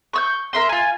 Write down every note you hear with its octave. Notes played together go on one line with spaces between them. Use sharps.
C#6 E6 G6
A#4 E5 C6
F4 G#5